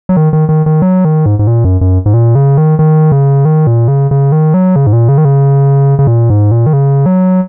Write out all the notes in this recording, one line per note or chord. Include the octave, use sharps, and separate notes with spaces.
F#3
D#3
D#3
D#3
D#3
F#3
D#3
G#2
G#2
A#2
F#2
F#2
G#2
A#2
C#3
D#3
D#3
C#3
D#3
A#2
C#3
C#3
D#3
F#3
C#3
G#2
A#2
C#3
D#3
C#3
C#3
A#2
G#2
A#2
D#3
C#3
F#3